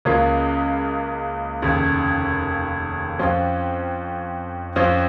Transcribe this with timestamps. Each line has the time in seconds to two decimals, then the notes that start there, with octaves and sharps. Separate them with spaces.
0.05 C#2 C#3 A#3 C#4 F4
1.62 F1 D#2 C#3
3.19 F2 F3 C#4 F4
4.76 F2 F3 C#4 F4